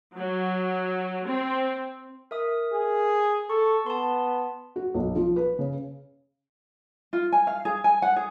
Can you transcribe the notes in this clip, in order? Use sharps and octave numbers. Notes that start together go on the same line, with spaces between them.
F#3
C4
A#4 E5 D#6
G#4
A4 C#6
B3 A5 C6
F#4
B1
F3
B4
C#3
F4
G#5
F5
G#4
G#5
F#5
G#4